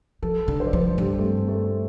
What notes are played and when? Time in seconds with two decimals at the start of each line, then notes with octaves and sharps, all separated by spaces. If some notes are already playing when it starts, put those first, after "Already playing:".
0.22 F3 A4
0.48 D3
0.60 C5
0.67 D5
0.73 F3 C5
0.98 G2 G4
1.19 A3
1.23 C4
1.49 A3